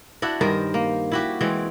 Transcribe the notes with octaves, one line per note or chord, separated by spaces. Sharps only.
D4 E4 F#4
G2 D#3 A#4 C5
A#3
E4 F#4 G4
E3 G#3 C4